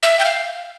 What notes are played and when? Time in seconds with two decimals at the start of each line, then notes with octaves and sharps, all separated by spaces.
0.03 E5
0.19 G5
0.25 F5